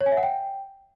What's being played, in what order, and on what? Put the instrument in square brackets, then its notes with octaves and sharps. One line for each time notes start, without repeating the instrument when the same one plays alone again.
[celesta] C#5
G#5
E5
F#5
G5